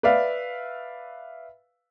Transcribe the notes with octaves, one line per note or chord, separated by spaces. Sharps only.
B4 D5 E5 F5